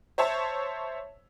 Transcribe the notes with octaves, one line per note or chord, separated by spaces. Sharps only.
C5 C#5 E5 A5